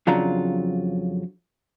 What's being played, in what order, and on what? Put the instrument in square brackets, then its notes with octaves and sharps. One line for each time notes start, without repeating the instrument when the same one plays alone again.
[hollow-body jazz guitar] F2 C#3 F#3 D4 F4 A#5